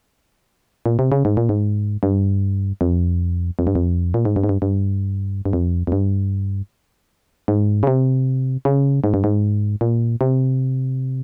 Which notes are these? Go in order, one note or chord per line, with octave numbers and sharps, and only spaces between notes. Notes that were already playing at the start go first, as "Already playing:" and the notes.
A#2
C3
C#3
G#2
A#2
G#2
G2
F2
F2
G2
F2
A#2
G#2
G2
G#2
G2
G2
G2
F2
F2
G2
G#2
C#3
C3
C#3
G#2
G2
G#2
A#2
C3